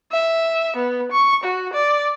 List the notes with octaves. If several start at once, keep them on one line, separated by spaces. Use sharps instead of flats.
E5
B3
C#6
F#4
D5